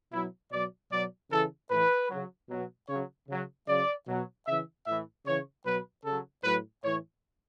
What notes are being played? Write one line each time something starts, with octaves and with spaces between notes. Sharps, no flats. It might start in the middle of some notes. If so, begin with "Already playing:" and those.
B2 F#3 E4
B2 F#3 D5
B2 F#3 D5
C#3 E3 A4
A2 E3 B4
C#3 F#3
B2 F#3
C#3 F#3 C#5
C#3 F#3
C#3 F#3 D5
B2 F#3
C#3 E3 E5
A2 E3 E5
C#3 E3 C#5
B2 F#3 B4
C#3 F#3 A4
A2 F#3 B4
A2 E3 C#5